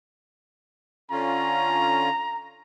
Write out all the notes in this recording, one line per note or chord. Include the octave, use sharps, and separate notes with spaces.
D3 C#4 F4 A#5